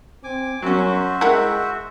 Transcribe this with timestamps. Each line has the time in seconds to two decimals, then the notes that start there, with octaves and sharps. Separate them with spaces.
0.24 C4 G#5 D6
0.62 F#2 F#3 C#4 F#4 C5 E5
1.21 G#3 E4 A#4 F#5 G5